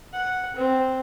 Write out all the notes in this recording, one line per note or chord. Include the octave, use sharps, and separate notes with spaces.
F#5
C4